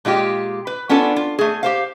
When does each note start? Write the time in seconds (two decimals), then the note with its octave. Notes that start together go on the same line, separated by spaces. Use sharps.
0.05 A#2 G#3 F4 G4
0.67 B4
0.89 B3 C#4 D4 F4 A4
1.16 F4
1.39 A3 G#4
1.63 G4 C5 F5